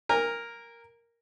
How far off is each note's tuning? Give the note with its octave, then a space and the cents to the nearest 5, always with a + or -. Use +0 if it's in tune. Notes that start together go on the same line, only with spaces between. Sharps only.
A#4 +0 G#5 -35